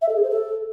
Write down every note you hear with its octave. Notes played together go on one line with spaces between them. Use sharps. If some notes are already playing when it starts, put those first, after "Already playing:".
E5
A4
G#4
C5
A4